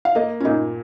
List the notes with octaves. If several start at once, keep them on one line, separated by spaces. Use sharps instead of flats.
F5
A#3 D#5
C#4
A#2 D#4